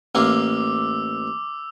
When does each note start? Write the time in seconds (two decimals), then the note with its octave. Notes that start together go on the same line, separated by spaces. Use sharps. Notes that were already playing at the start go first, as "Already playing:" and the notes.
0.15 A1 A#3 F4 D6 E6